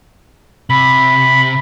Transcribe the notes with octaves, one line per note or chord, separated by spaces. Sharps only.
C3 B5